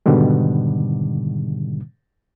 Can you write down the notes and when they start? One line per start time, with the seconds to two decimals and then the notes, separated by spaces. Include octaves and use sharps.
0.06 G#2 B2 D3 D#3 G3